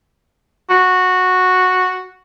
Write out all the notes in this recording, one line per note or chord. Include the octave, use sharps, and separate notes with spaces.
F#4